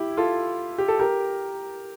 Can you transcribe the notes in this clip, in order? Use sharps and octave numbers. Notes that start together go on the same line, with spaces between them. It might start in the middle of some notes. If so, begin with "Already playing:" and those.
Already playing: E4 G4
F4 A4
G4
A4
G4 A#4